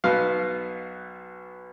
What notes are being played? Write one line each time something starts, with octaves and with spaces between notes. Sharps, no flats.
B1 B2 B3 F5